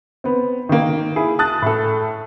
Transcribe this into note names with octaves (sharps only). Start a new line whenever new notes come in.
B3 C4
D#3 A#3
E4 G#4
A5 D#6 F#6 A6
A2 A4